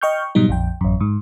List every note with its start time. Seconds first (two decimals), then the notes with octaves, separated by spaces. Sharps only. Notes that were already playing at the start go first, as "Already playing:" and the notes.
0.01 D#5 G5 C#6 F6 G6
0.35 G#2 B2 F#3 G3 D#4
0.49 A#1 F2 G5
0.81 A1 F#2
1.01 G#2